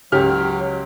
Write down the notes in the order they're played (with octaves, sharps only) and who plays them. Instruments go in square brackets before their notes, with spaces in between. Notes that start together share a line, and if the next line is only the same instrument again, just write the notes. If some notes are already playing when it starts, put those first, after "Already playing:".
[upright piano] C#2 G4 F6 [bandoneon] F#3